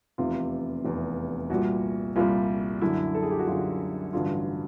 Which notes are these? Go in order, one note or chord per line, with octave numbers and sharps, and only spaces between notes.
F1 E2 C3 F4
F1 E2 C3
C2 A#2 G3 F#4
C2 A#2 G3 F4
F#2 D3 F#3 E4
A4
G#4
G4
F#4
F#2 D3 F#3 F4
A1 G2 D3 F#3 F4